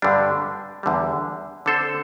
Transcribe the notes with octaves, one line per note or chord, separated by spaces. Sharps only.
G2 D3 G3 D4
E2 D3 G3
D3 C4 A4 C5